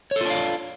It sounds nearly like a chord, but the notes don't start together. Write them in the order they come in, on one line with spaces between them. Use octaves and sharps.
C#5 A4 F4 D4 F5